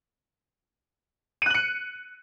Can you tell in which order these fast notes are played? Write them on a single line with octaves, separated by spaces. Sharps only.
D#7 F#6 F#7 C#7